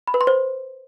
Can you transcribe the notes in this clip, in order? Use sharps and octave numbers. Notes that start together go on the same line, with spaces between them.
B5
B4
C6
C5